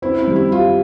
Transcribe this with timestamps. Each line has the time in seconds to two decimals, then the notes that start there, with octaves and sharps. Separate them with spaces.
0.02 C4 E4
0.19 E4
0.27 G3
0.36 E4
0.52 F4 G4